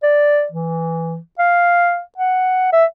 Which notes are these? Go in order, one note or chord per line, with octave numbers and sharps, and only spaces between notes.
D5
E3
F5
F#5
E5